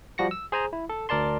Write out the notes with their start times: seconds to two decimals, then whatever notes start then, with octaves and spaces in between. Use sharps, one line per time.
0.18 F3 G3 F#4 A#6 C#7
0.31 E6
0.52 G#4 C5 G#5 A#5
0.73 E4
0.89 A4
1.09 D2 A#4 D5 A5 C6